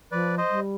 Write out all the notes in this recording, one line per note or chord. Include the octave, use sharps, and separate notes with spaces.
F3 B4 D5
C5 D#5
G3